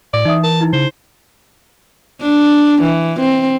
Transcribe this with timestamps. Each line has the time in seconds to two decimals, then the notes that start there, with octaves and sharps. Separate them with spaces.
0.13 A2 D5 D6
0.25 E3 D#4 E5 D#6
0.44 A#4 A5
0.61 D#4 E4
0.73 C#3 C5
2.21 D4
2.82 E3
3.20 C4